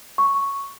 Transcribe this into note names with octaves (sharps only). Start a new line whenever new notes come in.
C#6